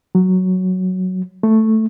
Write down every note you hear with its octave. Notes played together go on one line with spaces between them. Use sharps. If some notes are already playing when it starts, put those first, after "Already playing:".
F#3
A3